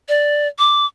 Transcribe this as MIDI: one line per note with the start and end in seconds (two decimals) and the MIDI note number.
0.09 0.48 74
0.59 0.86 86